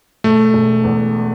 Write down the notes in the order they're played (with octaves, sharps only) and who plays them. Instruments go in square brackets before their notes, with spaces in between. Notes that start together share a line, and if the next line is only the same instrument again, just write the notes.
[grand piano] E1 [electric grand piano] A3
[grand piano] E1
E2